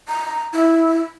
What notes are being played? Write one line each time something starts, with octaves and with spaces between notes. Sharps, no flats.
A#5
E4